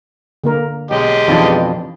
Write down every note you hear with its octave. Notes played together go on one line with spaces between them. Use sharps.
D3 A#3 A#4
B1 G#3 G4 D#5
F2 B2 E3 D4 D#4